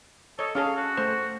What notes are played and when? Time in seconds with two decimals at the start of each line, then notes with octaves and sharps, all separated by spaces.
0.39 A4 C#5 D#5
0.55 C#4 G#4 A4 F5
0.77 F#4
0.97 A3 C5